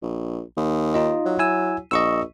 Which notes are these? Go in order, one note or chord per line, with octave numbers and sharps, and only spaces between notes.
A#1
D#2
D#4 F4 D#5
F#3
E4 G#5 E6
A#1 D#5 C#6 E6